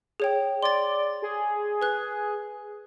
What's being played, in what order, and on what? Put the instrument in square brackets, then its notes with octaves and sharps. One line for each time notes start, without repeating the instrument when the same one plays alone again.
[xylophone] G#4 C#5 G5
[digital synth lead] D5 [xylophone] C6 A6
[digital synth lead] G#4
[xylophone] B4 F#6